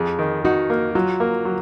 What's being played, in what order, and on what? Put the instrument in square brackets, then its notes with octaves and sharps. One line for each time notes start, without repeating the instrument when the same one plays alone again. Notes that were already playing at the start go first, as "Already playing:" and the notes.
Already playing: [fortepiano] F2 [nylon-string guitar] G#4
[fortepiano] D#3
[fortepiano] D#4 [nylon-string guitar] F#4
[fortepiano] A#3
[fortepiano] F#3 [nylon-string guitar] F4
[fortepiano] A#3
F#3